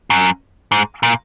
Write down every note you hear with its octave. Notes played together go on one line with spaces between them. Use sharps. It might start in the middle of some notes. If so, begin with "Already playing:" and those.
F#2
G#2
A#2